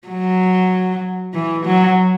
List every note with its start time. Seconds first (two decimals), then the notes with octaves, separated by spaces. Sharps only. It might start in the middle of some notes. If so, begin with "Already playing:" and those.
0.08 F#3
1.34 E3
1.65 F#3